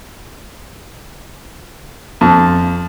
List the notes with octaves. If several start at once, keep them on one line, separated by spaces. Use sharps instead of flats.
F2